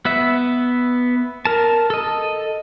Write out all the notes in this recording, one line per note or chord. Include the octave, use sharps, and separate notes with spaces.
B3 B4 E5
A#4 A5
A4 D#5